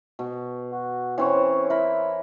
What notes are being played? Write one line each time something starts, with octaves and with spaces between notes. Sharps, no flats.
B2
F#4
E3 C4 C#4 C#5
E4 A#4 B5